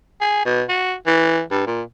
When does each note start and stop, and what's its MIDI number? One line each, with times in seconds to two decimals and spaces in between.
0.21 0.41 68
0.46 0.62 47
0.69 0.94 66
1.07 1.41 52
1.51 1.66 43
1.67 1.82 46